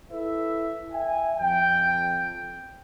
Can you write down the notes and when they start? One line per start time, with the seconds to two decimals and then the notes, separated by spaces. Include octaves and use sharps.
0.12 E4 A4 B4 E5
0.93 E5 G5 G#5
1.37 F2 G5